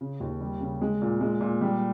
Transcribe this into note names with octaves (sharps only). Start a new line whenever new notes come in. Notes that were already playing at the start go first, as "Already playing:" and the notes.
C#3
D#2
G3
C#3
G#3
A#2
G#3
A#2
G3